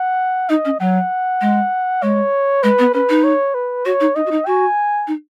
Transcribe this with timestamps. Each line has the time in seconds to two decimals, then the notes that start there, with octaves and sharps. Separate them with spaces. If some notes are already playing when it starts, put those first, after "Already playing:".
Already playing: F#5
0.49 D#4 D#5
0.65 C#4
0.80 F#3 F#5
1.41 G#3
2.02 G#3 C#5
2.63 G#3 B4
2.79 B3
2.94 C#4 B4
3.09 D#4
3.24 C#5
3.54 B4
3.85 F#4 C#5
4.00 D#4
4.15 D#4 D#5
4.26 F#4
4.31 D#4
4.46 F#4 G#5
5.07 D#4